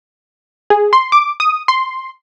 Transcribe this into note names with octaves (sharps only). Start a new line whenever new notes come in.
G#4
C6
D6
D#6
C6